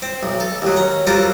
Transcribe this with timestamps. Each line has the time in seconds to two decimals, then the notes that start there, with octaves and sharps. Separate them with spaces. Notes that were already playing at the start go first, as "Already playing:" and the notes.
0.02 C4
0.23 B1
0.40 A4
0.62 D#2 F#3
0.76 C#4 A#5
1.07 F#3 G3 C4 F4 A4 A#4